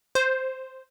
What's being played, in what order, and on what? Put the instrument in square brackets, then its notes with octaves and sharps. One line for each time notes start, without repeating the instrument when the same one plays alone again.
[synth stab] C5